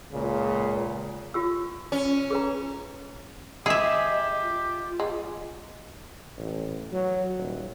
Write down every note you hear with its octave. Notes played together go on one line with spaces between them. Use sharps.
C#2 A#2 C#3
F4 G4 E6
C#4
G#4 B4 A#5
E4 G4 G#4 D#5 E5
F4
G#3
A1
F#3
D#1